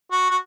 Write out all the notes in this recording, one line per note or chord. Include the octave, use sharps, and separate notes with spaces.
F#4
F#4